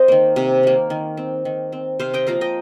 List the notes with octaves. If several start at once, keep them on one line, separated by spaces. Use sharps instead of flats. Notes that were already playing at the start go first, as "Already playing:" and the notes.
Already playing: C4 C5 D#5
D#3 A#3
C3
D#3 A#3
D#3
C4
D#3
C4
C3 C5 F5
D#5 G5
F3 A#3 F5 A#5
D#5 G5